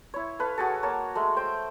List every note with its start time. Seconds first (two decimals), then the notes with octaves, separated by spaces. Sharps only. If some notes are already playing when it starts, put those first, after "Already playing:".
0.14 E4 C#5
0.39 A4 B4 F5
0.58 F#4 G#4 A4
0.83 A#3 C#5 A5
1.15 G#3 A3
1.36 A3 C5 G5